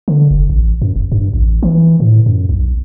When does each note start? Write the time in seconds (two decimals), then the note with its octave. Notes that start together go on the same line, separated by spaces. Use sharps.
0.08 D3
0.31 F1
0.50 A1
0.82 F#2
0.96 D#1
1.12 G2
1.33 A1
1.63 E3
2.00 A2
2.26 F#2
2.49 B1